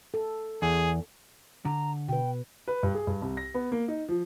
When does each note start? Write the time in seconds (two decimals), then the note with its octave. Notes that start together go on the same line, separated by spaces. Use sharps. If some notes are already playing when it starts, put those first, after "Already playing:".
0.14 A4
0.62 E2 G#4
1.65 D3 A#5
2.08 B2 B4 G5
2.68 B4
2.83 G2
2.95 G#4
3.07 G2
3.22 C2
3.37 A#6
3.54 B3
3.72 A#3
3.88 D#4
4.09 F3